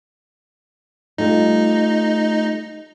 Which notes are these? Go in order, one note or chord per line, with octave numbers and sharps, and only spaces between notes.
G3 A3 D#4 F4